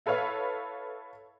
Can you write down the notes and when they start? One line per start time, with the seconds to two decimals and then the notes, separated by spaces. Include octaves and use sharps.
0.06 E4 A4 B4 C#5 F5